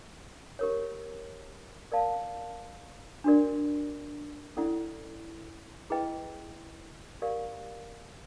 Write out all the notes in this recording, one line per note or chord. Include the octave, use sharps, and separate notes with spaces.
G4 A#4 C#5
A#4 D5 F5 A5
D4 F#4 A#4 D5
C#4 E4 A4 D5 F#5
E4 G#4 B4 D#5 G5
G4 A#4 D5 F5